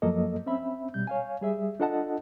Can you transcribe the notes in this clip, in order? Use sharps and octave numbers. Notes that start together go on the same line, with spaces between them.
F#2 F3 F#3 A#3 A4 D#5
C4 C#4 E5 B5
B2 G3 G6
C#5 F5 G#5
G3 G#4 E5
D4 F4 A4 D#5 F#5 A5